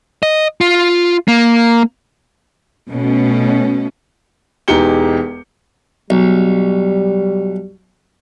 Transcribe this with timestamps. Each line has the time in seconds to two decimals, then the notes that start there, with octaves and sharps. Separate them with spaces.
0.23 D#5
0.61 F4
1.28 A#3
2.91 B2 A3 C#4
4.68 E1 E2 D#4 G4 C#7 G7
6.10 B1 G3